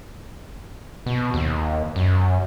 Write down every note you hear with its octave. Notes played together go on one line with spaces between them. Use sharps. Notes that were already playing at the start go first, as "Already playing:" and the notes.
B2
D#2
F#2